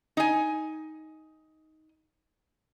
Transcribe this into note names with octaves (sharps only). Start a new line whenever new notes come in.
D#4 G#5